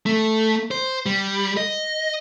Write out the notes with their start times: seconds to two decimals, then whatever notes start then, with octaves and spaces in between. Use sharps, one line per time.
0.06 A3
0.71 C5
1.06 G3
1.57 D#5